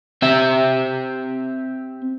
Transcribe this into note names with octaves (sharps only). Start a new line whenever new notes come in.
C4 G4 E5